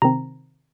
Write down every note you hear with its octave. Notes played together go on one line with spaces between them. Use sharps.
C3 D#3 C4 A#5